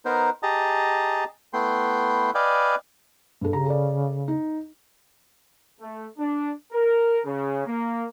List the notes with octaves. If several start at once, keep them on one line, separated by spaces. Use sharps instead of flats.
B3 D#4 A#4 C5
G4 G#4 D#5 A5 A#5
A3 B3 E4 G5 C6
B4 D5 D#5 F5 G5 G#5
G2 A4
C#3 G4 A#5
A4 D5
D#4
A3
D4
A#4
C#3
A#3